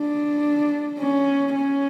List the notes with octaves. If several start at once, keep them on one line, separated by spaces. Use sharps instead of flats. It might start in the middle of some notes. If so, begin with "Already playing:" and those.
Already playing: D4
C#4
C#4